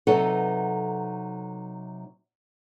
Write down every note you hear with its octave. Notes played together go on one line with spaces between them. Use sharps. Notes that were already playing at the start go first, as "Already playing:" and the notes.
C3 F#3 D#4 A4 B4 F#5